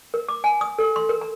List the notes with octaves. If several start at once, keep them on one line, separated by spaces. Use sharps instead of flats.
A#4
D6
G#5
D#6
A4
C6
A#4
A#5